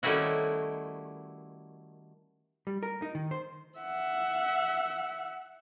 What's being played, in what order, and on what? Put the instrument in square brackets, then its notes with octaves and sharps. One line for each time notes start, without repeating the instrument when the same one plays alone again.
[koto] D#3 G3 A3 C#4 E4 F#4
[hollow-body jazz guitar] G3
A#4
D#4
D#3
C5
[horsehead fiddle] E5 F#5